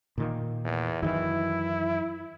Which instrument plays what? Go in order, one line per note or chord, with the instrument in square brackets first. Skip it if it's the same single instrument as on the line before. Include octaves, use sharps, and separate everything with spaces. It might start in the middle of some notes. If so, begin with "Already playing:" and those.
[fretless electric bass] A#2 D#3 A#3
[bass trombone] E2
[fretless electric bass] F#2 D#3 E3 [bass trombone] E4